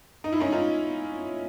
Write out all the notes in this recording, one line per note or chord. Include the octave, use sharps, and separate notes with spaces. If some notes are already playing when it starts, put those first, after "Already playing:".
D#4
E4
C#4 D#4
D#4 F4